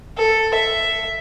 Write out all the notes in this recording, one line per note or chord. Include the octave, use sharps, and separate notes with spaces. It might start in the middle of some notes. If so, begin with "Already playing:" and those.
A4
E5